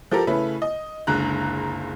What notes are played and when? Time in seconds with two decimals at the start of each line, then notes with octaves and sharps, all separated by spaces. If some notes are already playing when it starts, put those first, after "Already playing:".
0.11 F3 G4 A4 A#4
0.27 C#3 A3 C#4 E4 B4
0.62 D#5
1.07 F#1 C#2 D3 A#5 F#6